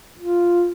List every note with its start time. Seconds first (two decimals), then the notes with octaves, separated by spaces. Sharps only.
0.19 F4